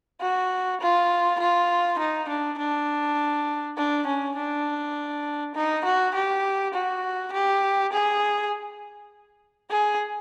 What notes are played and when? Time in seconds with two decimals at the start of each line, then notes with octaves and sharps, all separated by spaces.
0.21 F#4
0.81 F4
1.40 F4
1.99 D#4
2.29 D4
2.58 D4
3.77 D4
4.06 C#4
4.36 D4
5.55 D#4
5.85 F#4
6.14 G4
6.74 F#4
7.32 G4
7.92 G#4
9.70 G#4